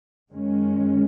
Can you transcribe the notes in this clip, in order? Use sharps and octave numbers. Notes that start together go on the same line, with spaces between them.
F#2 D#3 G#3 C#4